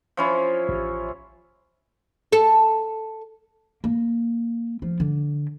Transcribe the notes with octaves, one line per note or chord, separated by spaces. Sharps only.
F3 C#4 E4
A1
A4
A#3
F3
D3